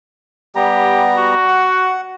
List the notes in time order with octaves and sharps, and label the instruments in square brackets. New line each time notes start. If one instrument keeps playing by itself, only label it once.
[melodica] G3 B3 A#5 [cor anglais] G4
[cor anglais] F#4
[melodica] F#5